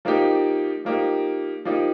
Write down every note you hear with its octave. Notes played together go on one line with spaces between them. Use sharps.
F3 A#3 D#4 G4
F3 A#3 D#4 G4
F3 A#3 D#4 G4